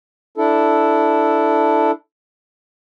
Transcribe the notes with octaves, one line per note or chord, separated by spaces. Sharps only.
D4 E4 A4